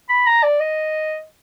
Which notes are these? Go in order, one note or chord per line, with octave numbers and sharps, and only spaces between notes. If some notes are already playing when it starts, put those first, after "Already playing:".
B5
A#5
D5
D#5